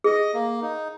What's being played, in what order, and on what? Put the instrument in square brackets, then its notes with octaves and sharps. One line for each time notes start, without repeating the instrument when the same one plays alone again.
[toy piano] G#4 [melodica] D#5
[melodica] A#3
D#4